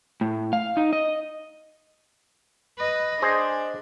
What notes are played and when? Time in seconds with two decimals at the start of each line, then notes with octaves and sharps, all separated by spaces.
0.21 A2
0.53 F5
0.77 D#4
0.93 D#5
2.78 B4 D#5
3.22 D4 G#4 C5 D#5